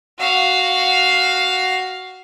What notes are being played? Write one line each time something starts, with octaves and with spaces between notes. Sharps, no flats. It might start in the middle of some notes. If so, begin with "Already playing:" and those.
F#4 F5